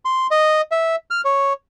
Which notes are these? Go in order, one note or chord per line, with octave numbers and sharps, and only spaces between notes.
C6
D#5
E5
F6
C#5